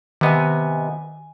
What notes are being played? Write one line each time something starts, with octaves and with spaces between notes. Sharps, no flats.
C3 D#3 B3 D#5 G#5